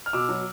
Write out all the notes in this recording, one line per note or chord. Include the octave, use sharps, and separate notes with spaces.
F6
B2 D6 E6
F#3